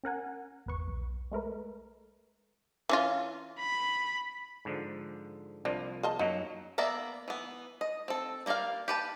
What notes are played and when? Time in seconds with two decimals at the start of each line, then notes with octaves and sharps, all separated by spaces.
0.04 C#4 A#4 F#5 G#5
0.66 G#1 E2 B4 C#6
0.87 B1
1.32 G#3 A3 A#4 B4
2.89 E3 C#4 F4
3.60 B5
4.65 G#2 D3 F3
5.65 C2 F3 A#3 D4
6.03 G#4 D#5 A5
6.19 F#2 F#3 A#3 D#4
6.78 A#3 B3 D5 E5 A#5
7.28 E3 B3
7.81 D#5
8.08 C4 A4
8.46 G3 A#3 F#4 D5 F5
8.88 G4 B4 A5